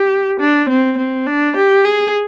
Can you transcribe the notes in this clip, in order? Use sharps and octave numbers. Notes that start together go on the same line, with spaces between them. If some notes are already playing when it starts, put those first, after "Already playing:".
Already playing: G4
D4
C4
C4
D4
G4
G#4